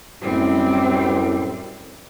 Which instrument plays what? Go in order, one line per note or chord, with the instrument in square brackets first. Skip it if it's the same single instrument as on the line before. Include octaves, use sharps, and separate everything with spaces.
[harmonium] F#2 A2 [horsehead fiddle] G3 C4